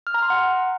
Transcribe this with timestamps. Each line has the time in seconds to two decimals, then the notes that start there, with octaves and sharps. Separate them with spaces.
0.07 F6
0.14 A#5
0.22 C6
0.30 F#5